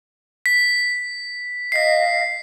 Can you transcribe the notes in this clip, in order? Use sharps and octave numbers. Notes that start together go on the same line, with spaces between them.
B6
D#5 F5 B6 C7